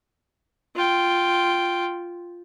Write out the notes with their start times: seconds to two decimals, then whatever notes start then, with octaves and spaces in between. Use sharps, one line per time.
0.75 F4 G5